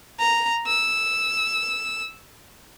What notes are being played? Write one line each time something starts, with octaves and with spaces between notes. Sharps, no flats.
A#5
E6